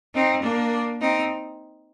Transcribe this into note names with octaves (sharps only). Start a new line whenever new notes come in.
C4 D#4
A#3 D4
C4 D#4